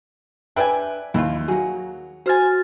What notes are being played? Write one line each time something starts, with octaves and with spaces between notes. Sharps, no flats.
D4 B4 D5 E5 G5 G#5
D#2 E4 F4
F#3 A#3 G#4
F#4 C5 G#5 F6 A6